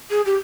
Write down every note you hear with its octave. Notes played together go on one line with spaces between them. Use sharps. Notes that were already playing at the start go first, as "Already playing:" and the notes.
G#4
G4